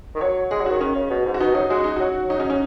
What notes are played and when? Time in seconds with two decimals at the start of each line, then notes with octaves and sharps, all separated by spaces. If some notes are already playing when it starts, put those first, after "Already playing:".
0.16 D#3
0.21 F#3 C#5
0.51 G#3 G#4
0.61 F#3
0.66 D#3 F#4
0.80 D#3 C#4
0.95 C#3
1.10 B2
1.26 G#2
1.34 F#4
1.40 B2 D#4
1.55 F#3 D#4
1.70 G#3 F#4
1.84 D#4
1.96 F#3 F#4
2.29 F#3 D#4
2.40 C#4
2.50 C#4